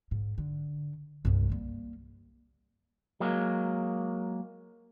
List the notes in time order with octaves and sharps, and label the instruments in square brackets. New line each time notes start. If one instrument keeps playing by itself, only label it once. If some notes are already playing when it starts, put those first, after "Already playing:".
[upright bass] G#2
D3
C2 G2
G3 A#3
[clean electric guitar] F#3 G#3 A#3